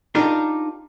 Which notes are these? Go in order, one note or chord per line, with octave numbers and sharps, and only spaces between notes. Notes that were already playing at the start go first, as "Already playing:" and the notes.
D4 D#4 F4 G4 A#4